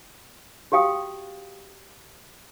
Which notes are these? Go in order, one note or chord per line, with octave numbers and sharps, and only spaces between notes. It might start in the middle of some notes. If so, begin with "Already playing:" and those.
F#4 G4 F5 G5 D#6